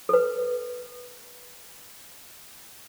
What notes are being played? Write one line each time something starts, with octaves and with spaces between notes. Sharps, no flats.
A4 B4